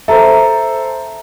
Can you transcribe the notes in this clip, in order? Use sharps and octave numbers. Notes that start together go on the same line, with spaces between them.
A4 C5 E5 A#5